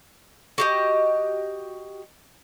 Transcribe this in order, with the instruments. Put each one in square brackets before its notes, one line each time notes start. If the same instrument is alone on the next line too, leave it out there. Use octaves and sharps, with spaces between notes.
[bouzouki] F#4 G4 D#5